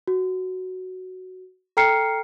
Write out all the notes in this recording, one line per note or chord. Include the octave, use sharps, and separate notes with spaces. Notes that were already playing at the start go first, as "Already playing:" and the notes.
F#4
A4 G5 A#5 F6 C7 C#7